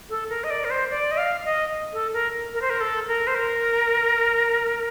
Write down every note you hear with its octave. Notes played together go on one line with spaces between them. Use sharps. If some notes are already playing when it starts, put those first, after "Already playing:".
A4
A#4
D#5
D5
A#4
C5
D5
D#5
F5
D#5
A4
A#4
A#4
C5
A#4
A4
A#4
C5
A#4